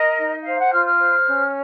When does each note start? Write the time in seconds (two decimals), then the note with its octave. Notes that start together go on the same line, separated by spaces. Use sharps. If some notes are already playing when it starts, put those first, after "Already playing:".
Already playing: A#4 D#5
0.18 D#4
0.45 C5 F5
0.59 F#5
0.73 F4 F6
0.86 F6
0.99 C5
1.27 C#4